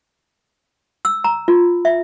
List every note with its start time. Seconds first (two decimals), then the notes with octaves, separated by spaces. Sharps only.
1.05 E6
1.24 A#5
1.48 F4
1.85 E5